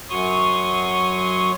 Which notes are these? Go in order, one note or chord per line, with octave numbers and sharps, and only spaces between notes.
F#2 F#3 C#5 C6 C#6 D#6